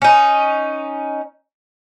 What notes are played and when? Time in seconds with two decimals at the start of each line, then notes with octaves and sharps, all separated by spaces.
0.02 C#4 D#4